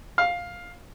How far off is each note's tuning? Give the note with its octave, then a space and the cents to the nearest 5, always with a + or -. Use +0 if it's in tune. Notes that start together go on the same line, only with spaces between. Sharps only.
F5 +10